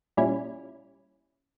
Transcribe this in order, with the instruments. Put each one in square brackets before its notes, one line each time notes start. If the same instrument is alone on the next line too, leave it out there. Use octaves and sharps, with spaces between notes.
[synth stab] A#2 G3 C#4 E4